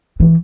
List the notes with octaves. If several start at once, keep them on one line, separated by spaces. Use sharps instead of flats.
E3